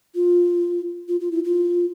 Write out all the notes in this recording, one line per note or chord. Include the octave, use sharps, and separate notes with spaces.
F4
F4
F4
E4
F4